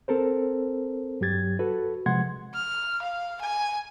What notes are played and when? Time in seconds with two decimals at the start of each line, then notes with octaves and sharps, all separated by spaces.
0.08 C4 A4 A#4 C5
1.21 G2 F#3 G4 G#6 A6
1.59 F#4 A4 B4
2.06 C3 F3 G#3 F#5 C6 G#6
2.54 F6
3.02 F5
3.41 G#5